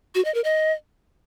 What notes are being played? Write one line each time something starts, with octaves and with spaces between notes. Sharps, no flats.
F#4
D#5
A#4
D#5